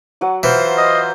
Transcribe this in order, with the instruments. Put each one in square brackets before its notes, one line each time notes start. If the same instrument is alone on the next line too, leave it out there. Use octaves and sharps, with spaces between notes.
[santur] F#3 F#5 D#6
[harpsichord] E3 [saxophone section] F4 C5
[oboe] D#5